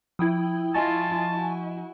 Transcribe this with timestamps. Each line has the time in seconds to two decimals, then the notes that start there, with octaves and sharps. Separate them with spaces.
0.19 F3 E4 G5 D#6
0.75 E4 F4 D#5 G#5 A5 C#6
1.30 E4 F#4